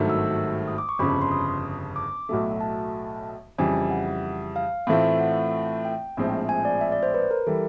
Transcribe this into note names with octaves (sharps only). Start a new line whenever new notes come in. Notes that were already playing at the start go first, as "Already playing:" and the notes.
Already playing: G#1 G2 D#3 F#3 A3
E6
D#6
D6
C#6
G1 F2 C#3 B5
B5
C6
D#6
D6
B1 A2 F#3 A3
A5
F2 C#3 E3 G3 G#5
F#5
F5
A2 E3 A3 C4 F4
F#5
G5
A#1 A2 F3 G#3 C4
G#5
D5
E5
D5
C5
B4
A#4
E3 G3 A4